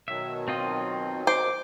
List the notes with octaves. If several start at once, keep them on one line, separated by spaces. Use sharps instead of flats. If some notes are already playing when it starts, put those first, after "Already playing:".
B2 D#3 F#3 E5
C4 F4 D#5
C5 D6